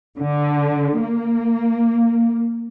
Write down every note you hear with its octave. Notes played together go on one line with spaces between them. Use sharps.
D3
A#3